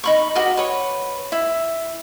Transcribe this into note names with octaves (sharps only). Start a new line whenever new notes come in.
D#4 B5 C#6
F#4 G4 A#4 D#5
B4 C#5
E4